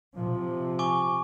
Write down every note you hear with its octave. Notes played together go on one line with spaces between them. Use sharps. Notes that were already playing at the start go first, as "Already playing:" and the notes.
C3 F3
G#5 C#6 D6